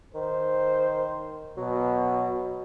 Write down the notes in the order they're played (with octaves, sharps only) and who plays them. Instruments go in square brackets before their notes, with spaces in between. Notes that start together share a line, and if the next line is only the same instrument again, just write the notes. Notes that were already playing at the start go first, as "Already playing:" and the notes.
[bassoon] D#3 [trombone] C5
[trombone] B2 [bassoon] F#3